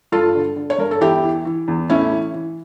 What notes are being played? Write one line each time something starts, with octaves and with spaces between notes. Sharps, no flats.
G2 F4 A4
D3
D3
C#5
G2 A#4
A4
E2 E4 G4
E3
E3
E2
A2 C#4 E4
E3
E3